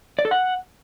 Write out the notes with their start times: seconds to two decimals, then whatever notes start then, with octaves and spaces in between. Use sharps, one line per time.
0.19 D5
0.25 A4
0.31 F#5